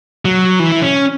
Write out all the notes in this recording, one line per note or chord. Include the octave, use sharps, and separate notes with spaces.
F#3
E3
E4
C#4